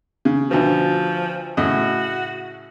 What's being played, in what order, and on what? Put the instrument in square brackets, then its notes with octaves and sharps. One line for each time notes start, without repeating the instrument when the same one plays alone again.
[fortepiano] C#3
[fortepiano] D2 B2 [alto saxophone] F3
[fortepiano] A2 C#3 D#5 [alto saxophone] F#4